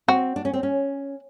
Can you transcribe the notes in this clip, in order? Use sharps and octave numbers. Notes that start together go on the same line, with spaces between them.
C4 F#4
D4
C#4
C4
C#4